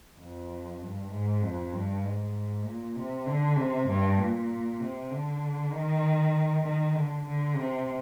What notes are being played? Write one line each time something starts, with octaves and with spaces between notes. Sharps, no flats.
F2
G2
G#2
F2
G2
G#2
A#2
C3
D3
C3
G2
A#2
C3
D3
D#3
D#3
D3
D3
C3